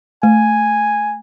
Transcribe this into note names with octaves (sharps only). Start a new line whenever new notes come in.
A3 G#5